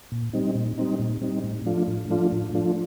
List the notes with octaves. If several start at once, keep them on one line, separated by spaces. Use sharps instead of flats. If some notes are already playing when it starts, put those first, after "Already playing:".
A#2
G3 C4 D#4
A#2
G3 C4 D#4
A#2
G3 C4 D#4
A2
F3 A3 D4 F4
A2
F3 A3 D4 F4
A2
F3 A3 D4 F4